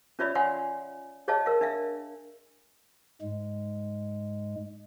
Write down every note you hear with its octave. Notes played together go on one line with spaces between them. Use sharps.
C#4 F4 C#5 D5 E5 B5
C#5 F5 F#5 G#5 C6
G#4 C#5 D#5 F5 A5
A#4 F5
D4 E5 F5
G#2 G#3